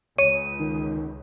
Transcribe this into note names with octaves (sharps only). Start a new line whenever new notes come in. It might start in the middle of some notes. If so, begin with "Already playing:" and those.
C#2 C#5 D#7
D#3